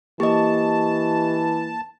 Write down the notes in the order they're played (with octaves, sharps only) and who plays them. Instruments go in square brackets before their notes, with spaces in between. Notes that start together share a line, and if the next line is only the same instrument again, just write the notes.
[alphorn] E3 [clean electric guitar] A#3 [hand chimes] G4 D#5 [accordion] A5